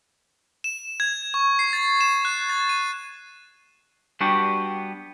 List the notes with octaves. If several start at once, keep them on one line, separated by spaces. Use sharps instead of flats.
E7
G#6
C#6
C7
A6
E7
F#6
A6
D#7
G3 B3 D4 F#4 G4